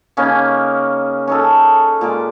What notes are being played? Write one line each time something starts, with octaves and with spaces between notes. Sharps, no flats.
C#3 A#3 C#4 D#4
C#4 D#4 A4
A#2 G#3 D6